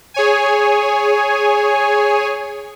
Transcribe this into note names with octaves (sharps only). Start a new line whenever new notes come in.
G#4 C#5 G#5